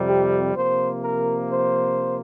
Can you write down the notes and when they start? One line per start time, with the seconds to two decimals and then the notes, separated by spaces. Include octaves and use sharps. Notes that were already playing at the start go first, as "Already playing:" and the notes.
Already playing: F2 C3 G3
0.08 G4
0.56 C3 F3 A#3 C5
1.03 A#4
1.50 C5